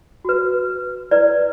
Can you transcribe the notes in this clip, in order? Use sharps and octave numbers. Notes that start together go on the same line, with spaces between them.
F#4 B4
E4 B4 D5